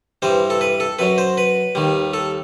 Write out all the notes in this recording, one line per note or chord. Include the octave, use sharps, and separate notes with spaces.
G2 E3 G3 C5
A4
B4
A4
F#2 F#3 B4
C5
B4
D#2 D#3 G3
A4